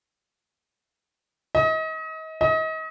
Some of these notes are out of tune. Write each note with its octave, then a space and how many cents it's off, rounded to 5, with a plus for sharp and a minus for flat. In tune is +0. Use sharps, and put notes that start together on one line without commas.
D#5 +35
D#5 +35